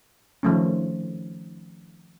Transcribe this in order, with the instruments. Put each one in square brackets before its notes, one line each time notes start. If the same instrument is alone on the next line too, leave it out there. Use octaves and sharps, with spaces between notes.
[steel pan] D#3 F3 A3 C#4